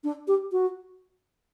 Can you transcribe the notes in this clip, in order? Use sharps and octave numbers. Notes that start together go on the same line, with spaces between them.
D4
G4
F#4